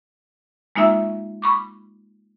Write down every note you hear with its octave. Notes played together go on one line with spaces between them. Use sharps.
G#3 A#3 D#4 F4 E5 E6
B5 C#6 D6